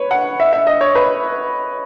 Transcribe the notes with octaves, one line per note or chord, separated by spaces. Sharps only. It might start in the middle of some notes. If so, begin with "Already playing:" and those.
Already playing: B4 C#5
F#5
E5
E5
D#5
C#5
B4